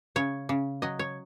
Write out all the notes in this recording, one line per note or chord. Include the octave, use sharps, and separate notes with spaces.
C#3 C#5
C#3
F#3 D#5
C#5